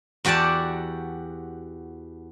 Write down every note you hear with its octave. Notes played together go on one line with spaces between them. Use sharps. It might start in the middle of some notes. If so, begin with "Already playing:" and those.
E2 F#4 G4 D5 A5